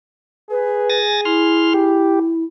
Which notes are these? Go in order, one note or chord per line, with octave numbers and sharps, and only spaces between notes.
G#4 B4
G#5 A6 A#6
E4 C6 F6
G4